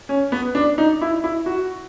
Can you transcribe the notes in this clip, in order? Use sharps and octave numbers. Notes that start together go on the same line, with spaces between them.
C#4
B3
D4
D#4
E4
E4
F#4